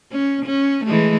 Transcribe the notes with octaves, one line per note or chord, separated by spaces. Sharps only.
C#4
C#4
E3 G#3 A3